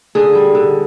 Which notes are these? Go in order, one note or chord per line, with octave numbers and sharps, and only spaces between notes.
D3 G#4
G3
D3